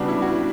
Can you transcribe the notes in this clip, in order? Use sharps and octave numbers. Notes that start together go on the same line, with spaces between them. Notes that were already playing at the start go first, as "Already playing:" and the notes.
Already playing: C#3 G3 B3 D4 F#4
E4
F#4